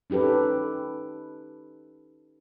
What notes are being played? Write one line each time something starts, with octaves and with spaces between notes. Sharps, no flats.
C#4 D#4 G4 A4 B4